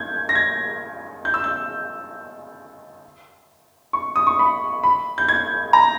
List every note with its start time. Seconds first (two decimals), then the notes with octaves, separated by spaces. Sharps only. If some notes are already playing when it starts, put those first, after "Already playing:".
Already playing: G6 G#6
0.29 A#6
0.35 G#6
1.25 G6
1.34 E6
1.44 G6
3.93 C#6
4.16 D#6
4.27 C#6
4.39 B5
4.83 B5
5.18 G6
5.28 G#6
5.73 A#5